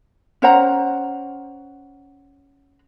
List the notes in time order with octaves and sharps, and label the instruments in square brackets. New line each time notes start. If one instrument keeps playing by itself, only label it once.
[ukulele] C#4 C5 F#5 A#5